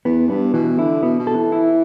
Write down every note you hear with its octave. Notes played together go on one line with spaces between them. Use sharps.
E2 B3
G2 B3
B2 E3
D3 E4
B2 B3
B2
A4
E3
E4